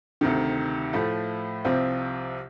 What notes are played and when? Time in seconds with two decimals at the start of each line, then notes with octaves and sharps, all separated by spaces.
0.21 D2 C3 D#3
0.93 A2 F3 A3
1.65 C2 C3 F3 C4